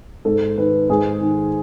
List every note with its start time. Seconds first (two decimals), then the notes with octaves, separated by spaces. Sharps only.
0.25 G#2 A4
0.57 D#3 B4
0.89 G#2 G#4
1.21 D#3